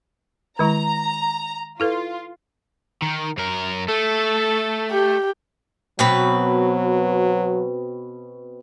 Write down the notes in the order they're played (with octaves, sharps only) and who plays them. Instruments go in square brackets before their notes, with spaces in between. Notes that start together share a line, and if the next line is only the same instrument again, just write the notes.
[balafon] D#3 G#3 E4 [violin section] A#5
[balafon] E4 A4 B4 [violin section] F4
[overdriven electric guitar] D#3
F#2 A#4
[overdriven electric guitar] A3 [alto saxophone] A4
[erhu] G4
[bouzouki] B2 C4 B4 [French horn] F#3